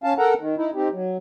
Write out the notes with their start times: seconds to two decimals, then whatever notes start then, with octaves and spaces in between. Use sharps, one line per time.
0.04 C#4 F5 A5
0.18 A4 A#4 F#5 A#5
0.40 D#3
0.57 D#4 E4
0.75 C4 D#4 G4
0.93 F#3